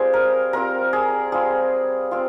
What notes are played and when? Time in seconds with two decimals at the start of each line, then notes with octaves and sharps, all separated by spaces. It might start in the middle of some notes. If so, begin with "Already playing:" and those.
Already playing: G3 C4 F4 G#4
0.14 A#4
0.53 G3 C4 F4 A#4
0.93 G#4
1.32 G3 C4 F4 G#4
2.11 C4 F4